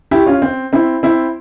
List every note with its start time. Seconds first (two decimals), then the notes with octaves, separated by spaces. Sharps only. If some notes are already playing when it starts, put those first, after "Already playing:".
0.11 E4 G4
0.26 C#4 F4
0.42 C4
0.73 C4 E4
1.03 C4 E4